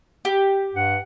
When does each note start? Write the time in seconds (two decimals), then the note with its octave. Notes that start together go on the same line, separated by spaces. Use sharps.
0.25 G4
0.74 G2 F#5